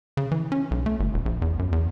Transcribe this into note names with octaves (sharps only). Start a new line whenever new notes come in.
C#3
E3
C#4
B1
A3
G1
D#1
A#1
E2
F#2
E2